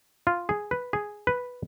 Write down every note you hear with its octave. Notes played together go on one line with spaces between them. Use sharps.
F4
G#4
B4
G#4
B4